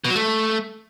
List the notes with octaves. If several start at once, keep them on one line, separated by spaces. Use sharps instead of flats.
B2
F#3
A3